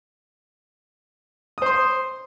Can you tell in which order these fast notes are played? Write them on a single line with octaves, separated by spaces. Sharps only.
D#6 C5 C6